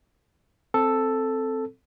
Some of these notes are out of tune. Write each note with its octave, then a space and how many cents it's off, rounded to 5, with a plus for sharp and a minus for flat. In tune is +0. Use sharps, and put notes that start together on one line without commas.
C4 +0 A4 +0